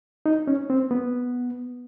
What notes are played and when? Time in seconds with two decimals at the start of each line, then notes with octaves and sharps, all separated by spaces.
0.26 D#4
0.48 C#4
0.70 C4
0.91 B3